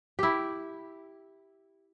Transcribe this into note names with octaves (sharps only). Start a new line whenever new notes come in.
E4 G4